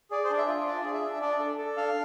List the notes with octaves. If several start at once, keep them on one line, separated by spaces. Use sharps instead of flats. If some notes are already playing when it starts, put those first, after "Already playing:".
G#4 D5
C5
D4 D5
E5
F4
D4 D5
G#4
E5
D4
D4 D5
A4
A4
D4 F5